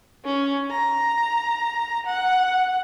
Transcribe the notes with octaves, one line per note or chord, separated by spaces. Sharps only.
C#4
A#5
F#5